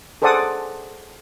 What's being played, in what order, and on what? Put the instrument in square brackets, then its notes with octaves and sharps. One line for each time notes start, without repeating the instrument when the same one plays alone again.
[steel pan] G#4 A4 C5 D5 F#5 D#6